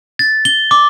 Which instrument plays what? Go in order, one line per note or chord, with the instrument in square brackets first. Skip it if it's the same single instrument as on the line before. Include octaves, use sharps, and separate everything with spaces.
[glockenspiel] A6
G7
D6